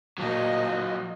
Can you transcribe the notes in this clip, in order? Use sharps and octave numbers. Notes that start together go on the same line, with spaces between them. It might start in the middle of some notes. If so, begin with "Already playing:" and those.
A#2 F#3 F4 D#5